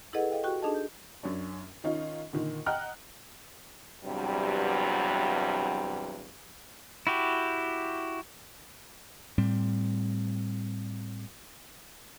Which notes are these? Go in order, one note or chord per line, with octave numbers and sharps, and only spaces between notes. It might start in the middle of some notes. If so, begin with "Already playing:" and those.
E4 G#4 A4 B4 D#5 F#5
A4 D#5 F5 G5
F#4 G4 G5 C#6
D4 D#4 G#4 A4 D#5 A5
G6
F#2 C#4 D4
D#3 C#4 D#4 F4
A#2 D3 D#3
D#5 F#5 G5 A#5 F6 F#6
E2 G2 C3 F#3 G3
E4 F#4 G4
A2 G3 C4